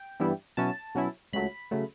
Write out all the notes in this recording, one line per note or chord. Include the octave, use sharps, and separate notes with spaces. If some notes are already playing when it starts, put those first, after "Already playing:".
Already playing: G5
G2 E3 G3 B3 E4
B2 F#3 C#4 E4 A5
B2 F#3 C#4 E4
C#2 C#3 F#3 A3 B5
C#3 F#3 A3